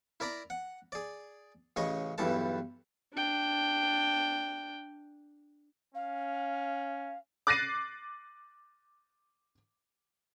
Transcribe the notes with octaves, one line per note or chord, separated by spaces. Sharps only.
E4 A#4 D5 A#5 B5
F#5
G#4 D5
A1 C#3 G#4 D#5 C#6
B1 E2 G2 E3 A4 A5
D4 G5
C#4 F5
D6 F#6 A6 A#6 C7 D#7